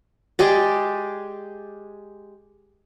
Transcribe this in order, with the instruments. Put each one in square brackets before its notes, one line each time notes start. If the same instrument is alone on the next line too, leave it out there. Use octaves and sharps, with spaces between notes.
[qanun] G#3 G4 G#4 D5